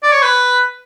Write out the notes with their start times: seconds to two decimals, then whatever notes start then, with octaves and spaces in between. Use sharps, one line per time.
0.03 D5
0.12 C#5
0.22 B4